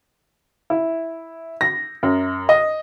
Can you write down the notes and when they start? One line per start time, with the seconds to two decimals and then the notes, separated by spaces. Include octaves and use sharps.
0.70 E4
1.61 A#6
2.03 F#2
2.49 D#5